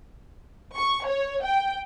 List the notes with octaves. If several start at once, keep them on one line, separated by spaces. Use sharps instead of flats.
C#6
C#5
G5